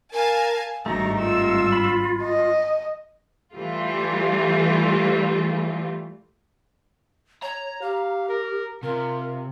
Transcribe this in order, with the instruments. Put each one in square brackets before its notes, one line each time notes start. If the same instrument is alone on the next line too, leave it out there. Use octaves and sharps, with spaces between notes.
[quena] A#4 [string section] F5 G#5 A5
[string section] G#1 G2 [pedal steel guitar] A3 D#4 [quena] F#4 [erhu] A#5
[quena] F4 [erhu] E6
[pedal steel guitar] B5
[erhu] D#5
[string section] E3 G3 A3 F4
[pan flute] C#5 [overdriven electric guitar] A#5
[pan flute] G4 [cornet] F5
[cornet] A#4
[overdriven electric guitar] C3 [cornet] F4 [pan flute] A#4